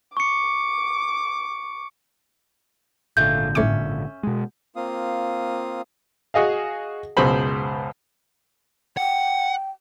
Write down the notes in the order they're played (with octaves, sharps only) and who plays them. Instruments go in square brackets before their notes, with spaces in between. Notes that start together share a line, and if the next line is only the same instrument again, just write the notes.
[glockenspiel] C#6 C#7 [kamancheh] D6
[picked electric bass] G#1 A#2 D3 [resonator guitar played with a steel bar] G#3 A3 F5 [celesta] G6
[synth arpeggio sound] G1 A2 D6 [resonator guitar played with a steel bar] C#4 E5
[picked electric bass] B2 G#3
[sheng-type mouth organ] A#3 C4 F4 F5 D#6
[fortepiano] F#4 G#4 D#5 F5
C#2 F#2 B2 G#3 C5 B5
[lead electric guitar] F#5 [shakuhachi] G5